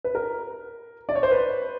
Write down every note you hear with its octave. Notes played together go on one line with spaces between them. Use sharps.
B4
A#4
D5
C#5
C5
B4